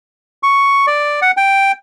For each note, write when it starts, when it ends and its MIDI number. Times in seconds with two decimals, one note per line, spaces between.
0.43 0.86 85
0.87 1.20 74
1.22 1.31 78
1.37 1.72 79